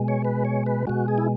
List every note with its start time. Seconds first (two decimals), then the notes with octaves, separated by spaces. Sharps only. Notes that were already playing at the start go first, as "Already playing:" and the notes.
Already playing: B2 G#3
0.08 C#5
0.25 B4
0.45 C#5
0.66 B4
0.87 B2 G#3 F#4
1.08 G#4
1.18 E4